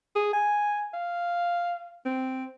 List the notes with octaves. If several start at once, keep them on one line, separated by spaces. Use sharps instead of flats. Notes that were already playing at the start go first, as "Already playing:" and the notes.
G#4
G#5
F5
C4